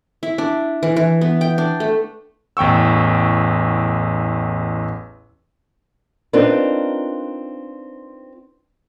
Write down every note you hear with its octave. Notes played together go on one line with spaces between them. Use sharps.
E4
D4
E3
E3
B3
G5
D4
A3
A1 E2 G5 C#6 E6
C4 D4 D#4 F4 A#4 B4